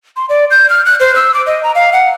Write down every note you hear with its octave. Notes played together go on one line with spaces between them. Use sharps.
C6
D5
G6
F6
F#6
C5
E6
D6
D#5
A#5
F5
F#5